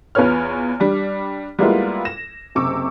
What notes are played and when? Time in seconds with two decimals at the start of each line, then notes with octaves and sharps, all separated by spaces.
0.15 E2 F4 B4 C#5 F6
0.80 G3 D4
1.59 G3 G#3 A#3 B3 E4 F4
2.05 A#6 E7
2.55 F#1 C3 C#6 D6 E6